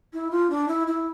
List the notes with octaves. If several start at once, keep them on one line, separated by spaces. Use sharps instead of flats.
E4
F4
D4
E4
E4